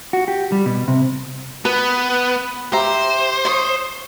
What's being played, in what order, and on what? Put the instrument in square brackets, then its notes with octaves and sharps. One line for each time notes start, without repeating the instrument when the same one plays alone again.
[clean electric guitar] F#4
G4
G3
B2
C3
[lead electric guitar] B3 [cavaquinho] B4
[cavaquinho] G4 E5 A#5 [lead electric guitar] C5
[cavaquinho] C#5 C6 D#6